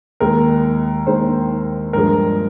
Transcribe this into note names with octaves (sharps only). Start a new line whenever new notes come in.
D#2 D#3 G#3 A#4
D#2 D#3 G#3 C5
G2 F3 G#3 A#4